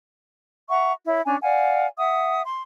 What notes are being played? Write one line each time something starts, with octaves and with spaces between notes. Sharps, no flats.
E5 F#5 A#5 C#6
E4 C#5
C#4 D4 G#5 A#5
D5 F5 F#5 G#5
E5 F#5 D#6
C6